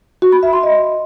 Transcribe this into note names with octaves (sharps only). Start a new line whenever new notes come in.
F#4
B5
E5
C6
D#5